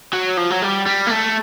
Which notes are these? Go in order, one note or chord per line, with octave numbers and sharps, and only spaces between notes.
F#3
F3
F#3
G3
G3
A#3
A3